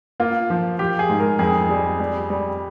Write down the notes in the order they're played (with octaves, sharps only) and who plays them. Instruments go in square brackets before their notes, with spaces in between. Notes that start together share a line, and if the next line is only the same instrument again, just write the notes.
[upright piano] A#3 [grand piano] F4
[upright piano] F3
[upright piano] F3 [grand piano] G4
[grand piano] G#4
[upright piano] G#2
[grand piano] A#4
[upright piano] F2 [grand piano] G#4
[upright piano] G3
G3
G3